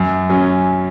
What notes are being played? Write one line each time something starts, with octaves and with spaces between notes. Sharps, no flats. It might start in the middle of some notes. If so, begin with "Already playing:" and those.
Already playing: F#2
F#3 C#4